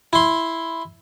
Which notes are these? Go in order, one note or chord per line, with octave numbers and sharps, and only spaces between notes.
E4 C6